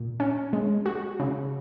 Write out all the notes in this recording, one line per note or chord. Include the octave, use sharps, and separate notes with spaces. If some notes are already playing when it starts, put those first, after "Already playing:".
Already playing: A#2
C#4
G#3
F#4
C#3